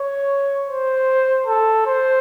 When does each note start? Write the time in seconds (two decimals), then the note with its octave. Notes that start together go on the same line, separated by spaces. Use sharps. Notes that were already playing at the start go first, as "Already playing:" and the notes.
Already playing: C#5
0.69 C5
1.47 A4
1.86 C5